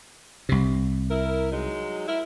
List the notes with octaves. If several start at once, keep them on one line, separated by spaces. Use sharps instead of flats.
C2 C3
E4 A#4
F#3 G#3 D#4
E4 A#4